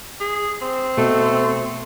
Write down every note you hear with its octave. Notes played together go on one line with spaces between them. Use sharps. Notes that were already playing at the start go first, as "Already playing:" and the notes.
G#4
C4
B2 A3